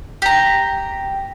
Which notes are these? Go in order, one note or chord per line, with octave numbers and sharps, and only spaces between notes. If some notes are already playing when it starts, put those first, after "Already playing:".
G4 A#5